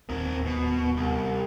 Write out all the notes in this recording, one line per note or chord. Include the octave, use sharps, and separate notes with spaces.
D1 D#2 C4 A#4
B2
C2